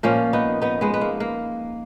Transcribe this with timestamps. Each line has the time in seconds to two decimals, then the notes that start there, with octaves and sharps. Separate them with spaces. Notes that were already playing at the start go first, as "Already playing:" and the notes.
0.03 A#2 F3 A#3 C#4
0.33 B3 D#4
0.62 B3 D#4
0.81 G#3 B3
0.94 B3
1.01 A#3
1.20 A#3